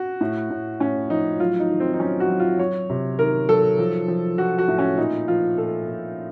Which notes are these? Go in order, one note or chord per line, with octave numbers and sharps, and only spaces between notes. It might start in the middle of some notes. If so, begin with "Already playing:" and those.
Already playing: F#4
A2
A2
A2 C#4
F3 D#4
F#3 F4
D#4
D#3
C4
D#4
F#3 C#4
F#4
F#3
F4
F#3 C#5
C3
D#3 A#4
F#3 A4
F3
F3
F3 F#4
F#4
A2
C#4
A#2 D#4
F3 F4
A#2 A4
A#2